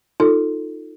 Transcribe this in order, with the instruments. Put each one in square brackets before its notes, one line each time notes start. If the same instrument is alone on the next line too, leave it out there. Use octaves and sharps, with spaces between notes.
[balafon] D#4 F4 A4